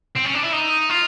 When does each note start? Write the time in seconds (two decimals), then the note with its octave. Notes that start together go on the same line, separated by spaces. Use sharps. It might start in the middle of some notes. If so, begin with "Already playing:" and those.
0.15 C4
0.25 C#4
0.34 D4
0.43 E4
0.52 D#4
0.89 F4